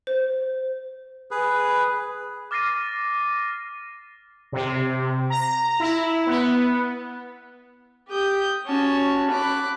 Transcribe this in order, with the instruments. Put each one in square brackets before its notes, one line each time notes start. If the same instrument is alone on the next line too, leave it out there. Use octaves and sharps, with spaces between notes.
[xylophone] C5
[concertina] G#4 B4
[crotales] D6 F6 A6 A#6 C7 D#7
[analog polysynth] C3
A#5
E4
B3
[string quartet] G4 D#6 G6
C#4 F#4 A5
B5 D6 F#6